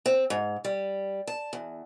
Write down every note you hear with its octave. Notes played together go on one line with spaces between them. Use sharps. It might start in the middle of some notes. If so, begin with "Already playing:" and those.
C4
G#2
G3
A5
E2